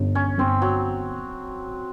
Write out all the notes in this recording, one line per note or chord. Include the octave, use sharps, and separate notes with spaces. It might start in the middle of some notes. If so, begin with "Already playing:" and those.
Already playing: G1
C#4
G1 C4
F#3